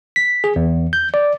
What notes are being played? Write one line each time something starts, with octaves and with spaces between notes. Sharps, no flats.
B6
G#4
E2
G6
D5